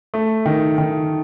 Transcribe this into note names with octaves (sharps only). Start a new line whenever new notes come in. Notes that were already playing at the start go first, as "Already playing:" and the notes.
A3
D#3
D#3